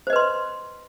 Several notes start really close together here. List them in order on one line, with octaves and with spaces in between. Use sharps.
C5 D#5 B4 C6